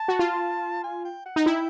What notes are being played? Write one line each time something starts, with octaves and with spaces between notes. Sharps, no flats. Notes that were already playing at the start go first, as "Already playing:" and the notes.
Already playing: A5
F#4
F4
G#5
G5
F#5
D#4
E4 G5